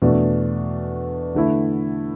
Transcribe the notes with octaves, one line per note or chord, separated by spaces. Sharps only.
E2 B2 A3 D4
D3 A3 E4